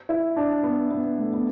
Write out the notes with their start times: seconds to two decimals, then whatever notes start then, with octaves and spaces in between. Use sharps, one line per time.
0.09 E4
0.36 D4
0.63 B3
0.91 B3
1.18 A3
1.33 B3